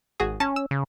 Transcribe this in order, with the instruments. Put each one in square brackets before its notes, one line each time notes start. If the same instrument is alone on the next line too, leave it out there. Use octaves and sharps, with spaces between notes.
[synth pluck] G#1 F#4 G#4
[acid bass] C#4 [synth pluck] A5 A6
[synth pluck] E6
[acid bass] C#3